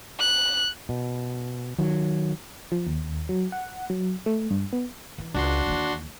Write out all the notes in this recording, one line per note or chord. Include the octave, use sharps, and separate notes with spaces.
F#6
B2
D#3 F#3
F3
D#2
F#3
F#5
F#3
A3
G2
B3
E3
C#2 D4 F#4 C6
D#2 E3